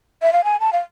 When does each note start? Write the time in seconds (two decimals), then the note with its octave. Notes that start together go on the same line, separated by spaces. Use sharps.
0.22 E5
0.33 F5
0.44 G#5
0.60 A5
0.73 F5